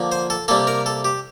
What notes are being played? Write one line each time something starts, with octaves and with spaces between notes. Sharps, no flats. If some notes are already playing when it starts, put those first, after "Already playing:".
Already playing: D3 F3 A#3
C5
A4
C3 G3 A#3 A4
A#4
A4
G4